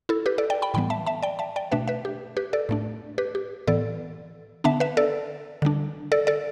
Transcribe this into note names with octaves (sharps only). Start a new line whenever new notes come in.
E4 A4
G4 B4
A4 D5
D5 G5
G5 B5
A2 E3 G3 B3 G5 B5
E5 A5
E5 A5
D5 G5
E5 A5
D5 G5
B2 A3 D4 B4 E5
B4 E5
G4
G4 B4
A4 D5
A2 A3 D4
G4 B4
G4
A2 E3 B3 A4 D5
D3 B3 D4 E5 A5
B4 E5
A4 D5
D3 G3 D4
A4 D5
A4 D5